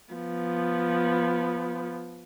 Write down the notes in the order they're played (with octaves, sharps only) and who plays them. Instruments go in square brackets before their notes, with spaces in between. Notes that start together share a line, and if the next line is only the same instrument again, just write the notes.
[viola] F3 B3